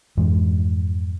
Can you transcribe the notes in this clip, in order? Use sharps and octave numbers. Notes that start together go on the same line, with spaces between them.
F2 G#2 E3 G#3